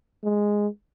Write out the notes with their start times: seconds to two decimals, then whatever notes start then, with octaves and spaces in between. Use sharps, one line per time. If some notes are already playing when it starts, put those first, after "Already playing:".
0.24 G#3